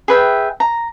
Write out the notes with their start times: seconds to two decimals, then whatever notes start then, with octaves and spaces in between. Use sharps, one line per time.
0.08 G#4 B4 E5 G5
0.60 A#5